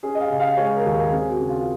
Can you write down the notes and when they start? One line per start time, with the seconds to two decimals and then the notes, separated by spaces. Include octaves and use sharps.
0.03 C#4 G#4
0.15 D#5
0.20 F5
0.29 C#3
0.40 F5
0.57 G#3 C#5
0.76 A#4
0.85 D#2
0.94 A#4
1.12 C4 G#4
1.30 F#4
1.39 C#3
1.49 F4